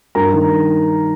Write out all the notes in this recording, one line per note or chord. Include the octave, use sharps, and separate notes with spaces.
G2 A#4 A#5
D#3